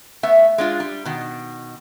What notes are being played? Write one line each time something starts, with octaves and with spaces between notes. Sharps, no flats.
A3 B3 E5
G#3 D4 F4
G3
B2 D#3